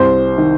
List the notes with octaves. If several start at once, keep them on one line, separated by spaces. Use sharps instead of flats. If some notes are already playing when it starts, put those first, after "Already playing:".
Already playing: C2 C5
D#3